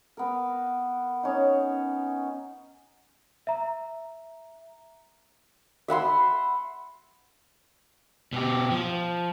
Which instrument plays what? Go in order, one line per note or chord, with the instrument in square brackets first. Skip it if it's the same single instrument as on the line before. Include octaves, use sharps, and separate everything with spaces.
[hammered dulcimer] B3 A#4
C#4 D#4
[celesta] E5 A#5
[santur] E5 F#5 B5 C6
[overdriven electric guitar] B2 G4
F3